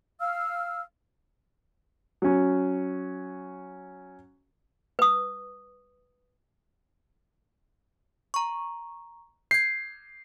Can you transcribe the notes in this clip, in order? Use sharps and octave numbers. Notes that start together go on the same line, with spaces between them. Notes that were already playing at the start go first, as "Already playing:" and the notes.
F5 E6 F6
F#3 C#4
B4 D#6
A#5 C#6
G6 G#6 C7